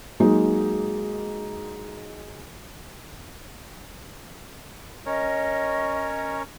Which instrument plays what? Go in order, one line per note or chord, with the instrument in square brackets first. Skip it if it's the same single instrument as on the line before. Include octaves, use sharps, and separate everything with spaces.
[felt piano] F#3 G#3 A#3 D#4
[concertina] C#4 A#4 C#5 [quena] D#5